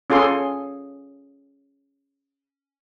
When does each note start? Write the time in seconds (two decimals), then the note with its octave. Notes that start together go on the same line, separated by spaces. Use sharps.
0.10 C#4 F4 G#4 A4 C6